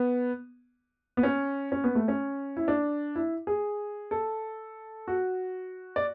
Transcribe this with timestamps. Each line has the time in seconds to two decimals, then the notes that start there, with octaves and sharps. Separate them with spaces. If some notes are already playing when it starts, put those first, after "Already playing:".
Already playing: B3
1.17 B3
1.23 C#4
1.72 C#4
1.84 B3
1.95 A3
2.08 C#4
2.57 E4
2.68 D4
3.15 E4
3.47 G#4
4.11 A4
5.08 F#4
5.96 D5